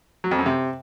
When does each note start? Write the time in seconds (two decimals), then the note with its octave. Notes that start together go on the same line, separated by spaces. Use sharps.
0.24 F#3
0.31 F2
0.39 F#2
0.46 C3